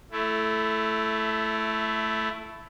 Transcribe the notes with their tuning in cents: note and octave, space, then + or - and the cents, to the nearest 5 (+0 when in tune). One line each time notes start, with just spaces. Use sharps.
A3 -5 E4 +15